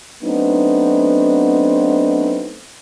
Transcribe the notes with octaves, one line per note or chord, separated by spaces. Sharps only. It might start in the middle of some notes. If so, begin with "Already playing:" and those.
F#3 A3 B3 C4 D4 D#4